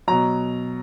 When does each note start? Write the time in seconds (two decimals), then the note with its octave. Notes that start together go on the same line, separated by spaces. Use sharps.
0.08 B2 F#3 A#5